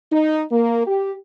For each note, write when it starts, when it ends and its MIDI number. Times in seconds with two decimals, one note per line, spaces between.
0.11 0.44 63
0.51 0.86 58
0.86 1.13 67